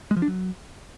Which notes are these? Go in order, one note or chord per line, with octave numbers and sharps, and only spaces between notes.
G#3
F3
D4
F#3